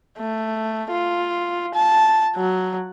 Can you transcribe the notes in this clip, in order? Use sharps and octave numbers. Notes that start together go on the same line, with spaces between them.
A3
F4
A5
F#3